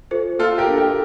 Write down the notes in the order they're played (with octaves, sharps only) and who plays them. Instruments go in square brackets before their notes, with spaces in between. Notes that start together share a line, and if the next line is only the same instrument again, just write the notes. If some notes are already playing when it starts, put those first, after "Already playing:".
[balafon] F4 A4 C5
[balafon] A#3 [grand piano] F4 A4
[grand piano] G4 A#4
[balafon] D4 A4
[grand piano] G4 A#4